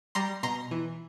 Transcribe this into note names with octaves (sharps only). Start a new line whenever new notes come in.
G3 A#5 C6
B2 A#5 C6
E3